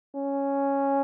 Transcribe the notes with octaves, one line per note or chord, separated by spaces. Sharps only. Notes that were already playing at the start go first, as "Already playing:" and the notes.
C#4